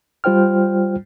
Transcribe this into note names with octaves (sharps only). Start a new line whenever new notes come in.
G3 F4 C5 G5 F6